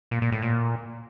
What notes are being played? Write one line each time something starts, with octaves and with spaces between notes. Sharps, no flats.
A#2
A#2
A2
A#2